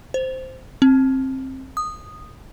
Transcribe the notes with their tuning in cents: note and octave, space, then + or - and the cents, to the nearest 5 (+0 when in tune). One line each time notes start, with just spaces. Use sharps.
C5 -5
C4 +20
D#6 -10